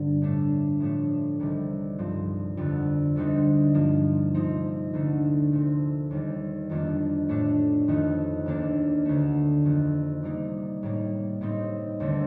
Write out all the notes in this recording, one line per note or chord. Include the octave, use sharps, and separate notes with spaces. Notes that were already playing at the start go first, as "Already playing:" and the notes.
Already playing: G2 D3 C4
A2 A3 D4
A2 F3 A3 D4
C2 C3 D#3 G3
G2 F3 C4
F2 D3 G3
D2 D3 G3 C4 D#4
G2 F3 A#3
C3 F3 C4 D#4
D2 D3 A3
A#2 A3 C4
D#2 D#3 G3
F2 D#3 A#3 D4
A2 A3 D4
F2 D#3 A3 D#4
D#2 D#3 A#3 D4
D2 D3 A3
F2 D#3 A#3
C3 G3 A#3 D#4
A2 G3 A#3 D#4
A2 G3 C4 D#4
D#2 D3 A3 C4